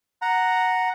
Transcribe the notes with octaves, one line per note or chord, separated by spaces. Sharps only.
F#5 A#5